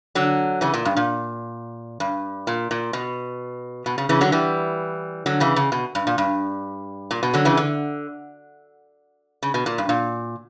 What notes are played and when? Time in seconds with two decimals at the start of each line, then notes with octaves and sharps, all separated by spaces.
0.15 D3 F#3
0.61 C#3 E3
0.74 A#2
0.85 G2
0.96 A#2
2.00 G2
2.47 A#2
2.71 A#2
2.93 B2
3.86 B2
3.98 C#3
4.09 C#3 E3
4.21 D3 F#3
4.32 E3 G3
5.26 D3 F#3
5.40 C#3 E3
5.56 C#3
5.72 B2
5.95 G2
6.07 A#2
6.18 G2
7.11 A#2
7.23 B2
7.33 D3 F#3
7.45 C#3 E3
7.57 D3
9.43 C#3
9.54 B2
9.66 A#2
9.78 G2
9.89 A#2